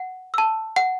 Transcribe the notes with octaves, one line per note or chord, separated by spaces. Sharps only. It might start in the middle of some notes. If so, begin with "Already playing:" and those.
Already playing: F#5
A5 E6
F#5